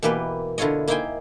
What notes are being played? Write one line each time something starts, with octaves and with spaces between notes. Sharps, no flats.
B2 E3 A#3 G4 B4
D3 E4 F4 C#5 D#5
A#3 D#4 E4 C5 G5 G#5